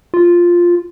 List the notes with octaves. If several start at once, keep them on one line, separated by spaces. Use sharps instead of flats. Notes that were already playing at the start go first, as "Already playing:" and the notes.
F4